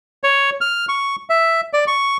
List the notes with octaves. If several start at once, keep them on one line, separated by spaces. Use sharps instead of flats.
C#5
F6
C#6
E5
D5
C#6